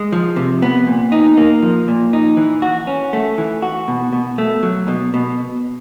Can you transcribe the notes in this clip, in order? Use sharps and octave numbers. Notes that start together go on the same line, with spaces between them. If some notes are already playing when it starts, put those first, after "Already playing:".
Already playing: G#3
F3
C3
B3
A#2
D#4
A#3
F3
A#2
D#4
E3
F#4
C#4
A3
E3
F#4
B2
B2
A3
F#3
B2
B2